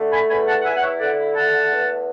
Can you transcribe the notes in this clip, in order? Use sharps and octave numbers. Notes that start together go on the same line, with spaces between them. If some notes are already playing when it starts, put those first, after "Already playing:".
Already playing: D3 A3
G#5 B5
E2 G#5 B5
F#5 A5
F#5
E4 E5 G#5
F#5
C#5 E5
D3 D5 F#5
A3 F#5 A5
E2